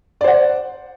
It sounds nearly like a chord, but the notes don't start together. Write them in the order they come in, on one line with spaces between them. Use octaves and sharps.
D5 C5 F#5